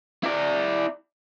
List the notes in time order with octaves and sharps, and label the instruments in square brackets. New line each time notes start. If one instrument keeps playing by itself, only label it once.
[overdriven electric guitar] E4 D5